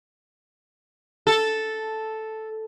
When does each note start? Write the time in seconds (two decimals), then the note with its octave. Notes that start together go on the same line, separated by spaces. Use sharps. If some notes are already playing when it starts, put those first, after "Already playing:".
1.27 A4